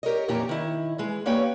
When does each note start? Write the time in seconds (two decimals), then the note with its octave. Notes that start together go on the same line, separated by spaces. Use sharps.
0.03 G4 A#4 C#5 D#5
0.28 F2 A#2 E3 C#4 G4 A#5
0.49 D#3 E4
0.98 E3 G#3
1.26 A#3 C#4 G4 B4 C#5 G5